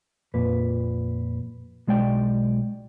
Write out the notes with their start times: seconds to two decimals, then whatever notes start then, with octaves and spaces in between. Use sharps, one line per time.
0.34 F2 A#2 B4
1.88 B1 G#3 D5 G5